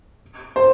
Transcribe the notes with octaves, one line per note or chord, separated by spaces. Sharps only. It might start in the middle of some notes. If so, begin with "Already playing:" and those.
C5